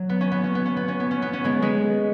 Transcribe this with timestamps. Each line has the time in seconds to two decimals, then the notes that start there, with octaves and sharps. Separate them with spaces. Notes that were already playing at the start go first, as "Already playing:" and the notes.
Already playing: F#3
0.09 B3
0.21 C#4
0.32 B3
0.44 C#4
0.55 B3
0.65 C#4
0.77 B3
0.88 C#4
1.00 B3
1.11 C#4
1.22 B3
1.33 C#4
1.44 G#3 B3
1.62 G#3 B3